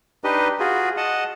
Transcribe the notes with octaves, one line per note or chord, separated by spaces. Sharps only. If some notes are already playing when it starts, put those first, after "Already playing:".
D4 D#4 G4 B4 D#5
F4 F#4 G#4
D#5 F#5 A5